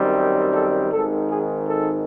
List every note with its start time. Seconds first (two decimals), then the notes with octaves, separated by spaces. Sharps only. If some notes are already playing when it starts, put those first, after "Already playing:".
Already playing: F#2 D#3 G3 C4
0.54 A4
0.92 G#1 G#2 D#3 A4
1.30 G#4
1.68 A4